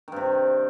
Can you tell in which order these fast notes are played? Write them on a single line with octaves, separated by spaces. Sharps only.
D#3 G2 C3